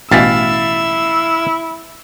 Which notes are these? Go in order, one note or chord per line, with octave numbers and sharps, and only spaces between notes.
A1 B2 E3 E4 F5 E6 A6 B6